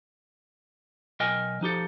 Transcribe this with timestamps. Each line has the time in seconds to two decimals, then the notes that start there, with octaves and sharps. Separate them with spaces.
1.20 B1 A#4 D#5 G5 G#5
1.61 F3 D#4 G4 A4